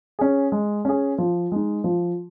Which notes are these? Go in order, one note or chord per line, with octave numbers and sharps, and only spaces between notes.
C#4 G#4
G#3
C#4 G#4
F3
G#3 D#4
F3